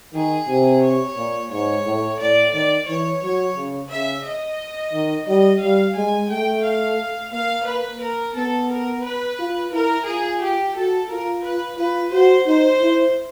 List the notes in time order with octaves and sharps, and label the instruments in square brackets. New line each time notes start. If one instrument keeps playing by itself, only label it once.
[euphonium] D#3 [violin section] G#4
[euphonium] C3
[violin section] C#5
[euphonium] A#2
[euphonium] G#2 [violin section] C#5
[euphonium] A2
[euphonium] A2 [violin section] D5
[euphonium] D#3 [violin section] D5
[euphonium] E3 [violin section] C#5
[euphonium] F#3 [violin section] C#5
[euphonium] C#3
[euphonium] C#3 [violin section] E5
[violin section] D#5
[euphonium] D#3
[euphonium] G3 [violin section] D#5
[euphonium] G3 [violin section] F5
[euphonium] G#3 [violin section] G#5
[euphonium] A3 [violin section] G5
[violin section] F5
[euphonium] A#3 [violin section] F5
[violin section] B4
A#4
[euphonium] B3 [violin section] A4
[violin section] A#4
B4
[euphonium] F4
[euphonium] E4 [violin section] A#4
[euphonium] F4 [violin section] G#4
[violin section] G4
[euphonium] F#4 [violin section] A4
[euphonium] F4 [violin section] A#4
[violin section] B4
[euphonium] F4 [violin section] B4
[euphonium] F#4 [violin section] C5
[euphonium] D#4 [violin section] C5
[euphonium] E4